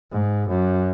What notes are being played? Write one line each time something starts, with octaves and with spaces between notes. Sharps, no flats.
G#2
F#2